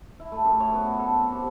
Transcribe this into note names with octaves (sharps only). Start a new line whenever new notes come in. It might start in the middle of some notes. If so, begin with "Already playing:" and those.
E4
A3
F#2
C#5
B3
F#4
A4
C4
G4